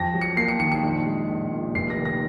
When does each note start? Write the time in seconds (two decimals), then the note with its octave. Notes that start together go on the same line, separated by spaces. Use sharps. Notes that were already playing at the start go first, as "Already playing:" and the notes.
Already playing: F2 A#6
0.14 F#3
0.21 C#7
0.36 A#3 C7
0.48 C#7
0.59 D#3 C#7
0.72 C#7
0.83 A#1
1.06 G#3
1.29 A#1
1.52 A#2
1.75 F1 C7
1.90 A#6
1.97 D#3
2.05 A#6